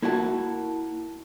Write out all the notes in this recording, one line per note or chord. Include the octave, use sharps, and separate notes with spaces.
A#3 E4 F#4 F#5 G5 A5